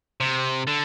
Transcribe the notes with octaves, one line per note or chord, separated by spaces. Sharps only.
C3
D3